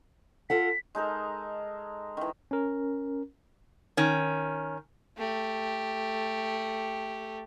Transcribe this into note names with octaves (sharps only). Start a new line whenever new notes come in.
F4 A4 F#5 B6
G#3 D#4 A4 A#4
D#3 E3
C#4 A#4
D#3 C#4
A3 G4